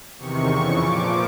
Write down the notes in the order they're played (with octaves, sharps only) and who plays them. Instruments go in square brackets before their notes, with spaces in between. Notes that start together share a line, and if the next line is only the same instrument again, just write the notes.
[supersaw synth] E2 C3 D#3 C#6
F2 C#3 E3
A#2 F3 D6